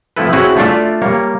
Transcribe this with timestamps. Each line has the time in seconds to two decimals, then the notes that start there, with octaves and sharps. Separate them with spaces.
0.16 F3 A3 C4 E4 A4 B4
0.33 C4 C#4 E4 F#4 G#4
0.57 A3 D4 F4 D5 E5
1.02 G3 A#3 C#5